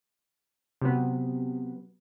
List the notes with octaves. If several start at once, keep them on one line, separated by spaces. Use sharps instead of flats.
C3 F#3 B3